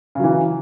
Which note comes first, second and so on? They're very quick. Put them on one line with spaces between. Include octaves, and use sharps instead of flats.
C#3 F#3 E3